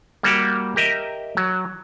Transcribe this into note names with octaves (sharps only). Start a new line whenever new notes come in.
G3 A#3 F#4 G4
G4 A#4 D#5 E5
F#3